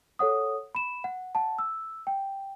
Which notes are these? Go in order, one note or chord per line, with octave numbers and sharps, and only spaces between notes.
A4 C#5 F#5 D#6
B5 E7
F#5
F#5 A5
E6
G5